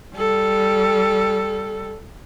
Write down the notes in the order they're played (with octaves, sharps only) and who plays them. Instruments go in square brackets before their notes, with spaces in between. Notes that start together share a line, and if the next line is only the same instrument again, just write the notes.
[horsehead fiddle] G3 A4